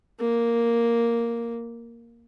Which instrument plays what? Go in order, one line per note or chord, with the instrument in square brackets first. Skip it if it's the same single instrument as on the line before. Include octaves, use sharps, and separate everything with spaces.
[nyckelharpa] A#3